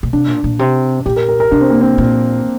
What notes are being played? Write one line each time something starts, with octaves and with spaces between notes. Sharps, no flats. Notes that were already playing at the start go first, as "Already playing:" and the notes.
A#2
C3 D4
A#2
A#2
C3
A#2 G4
A#4
A#4
A#4
C3 D4
C4
A#3
C4
A#2